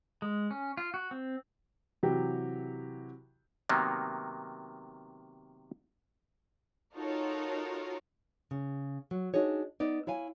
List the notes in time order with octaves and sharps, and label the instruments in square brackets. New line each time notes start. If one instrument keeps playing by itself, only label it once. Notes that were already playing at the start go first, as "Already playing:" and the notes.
[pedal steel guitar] G#3
C#4
F4
F#4
C4
[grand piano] C3 E3 F#3 F#4 G4
[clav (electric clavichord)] C3 D#3 F#3 A#3 B3
[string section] D#4 F4 F#4 A4 A#4 C#5
[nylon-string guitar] C#3
F#3
D4 D#4 F#4 G#4 C#5
B3 D#4 D5
E4 C#5 F5 G#5